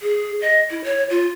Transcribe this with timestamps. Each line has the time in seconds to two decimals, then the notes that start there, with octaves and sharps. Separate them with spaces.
0.02 G#4
0.41 D#5
0.70 E4
0.84 C#5
1.10 F4